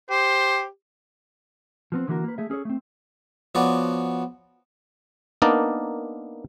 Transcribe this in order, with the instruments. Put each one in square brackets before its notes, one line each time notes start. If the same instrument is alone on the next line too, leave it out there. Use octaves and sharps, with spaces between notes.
[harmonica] G4 [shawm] C5
[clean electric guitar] F3 B3 C4
D3 E3 A#3 F#4 A#4
A#3 B4
A3 G#4 E5
C#4 G#4 A4 C#5
A3 C4
[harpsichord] F3 B3 F#4 C#5 D5
[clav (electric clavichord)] A#3 B3 D4 D#4 A#4 D5